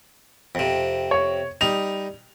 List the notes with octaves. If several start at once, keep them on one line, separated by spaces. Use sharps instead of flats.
F2 C3
C#5
G3 D#4 F7